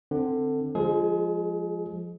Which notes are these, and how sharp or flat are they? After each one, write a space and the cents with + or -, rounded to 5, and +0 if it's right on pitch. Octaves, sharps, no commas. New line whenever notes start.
D3 +20 C4 +0
F3 +0 G#3 -15 G#4 +35